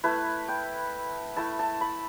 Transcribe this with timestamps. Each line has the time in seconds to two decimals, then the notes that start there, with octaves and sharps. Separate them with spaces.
0.04 A3 E4 B4
0.48 G5
1.36 A3 E4 A5
1.59 A5
1.81 B5